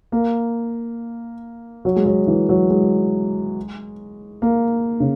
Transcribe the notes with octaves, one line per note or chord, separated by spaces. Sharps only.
A#3
F#3
G#3
F#3
E3
F#3
G#3
A#3
C#3